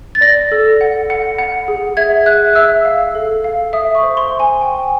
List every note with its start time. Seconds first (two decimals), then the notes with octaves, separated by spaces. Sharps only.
0.15 A6
0.21 D5 A#6
0.52 A4
0.81 F#5
1.10 F#5
1.39 F#5
1.68 G#4
1.97 E5 G#6
2.26 E5 F#6
2.55 E5 E6
2.85 F5
3.15 A4
3.44 F5
3.73 E5 D#6
3.95 C#6
4.03 C5
4.17 C6
4.32 C5
4.40 G#5
4.61 G5